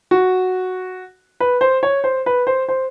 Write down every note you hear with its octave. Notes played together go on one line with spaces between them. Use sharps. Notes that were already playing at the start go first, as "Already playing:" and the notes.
F#4
B4
C5
C#5
C5
B4
C5
C5